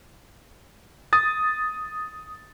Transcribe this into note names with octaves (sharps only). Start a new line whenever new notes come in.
D#6 A6